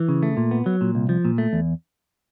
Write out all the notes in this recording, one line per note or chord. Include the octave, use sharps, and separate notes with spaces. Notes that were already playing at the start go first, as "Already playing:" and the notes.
Already playing: E3
C#3
A3
A#2
B3
F#3
A#2
C2
F3
A#2
A3
E2